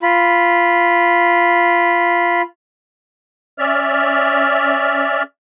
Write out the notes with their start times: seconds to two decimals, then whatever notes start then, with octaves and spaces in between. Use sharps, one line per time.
0.02 F4 B5
3.58 C#4 D5 E5 F6